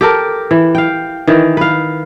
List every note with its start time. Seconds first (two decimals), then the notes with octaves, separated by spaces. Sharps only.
0.01 G4 A4 A#4
0.51 E3
0.75 F5 G5
1.27 D#3 E3
1.57 B4 F5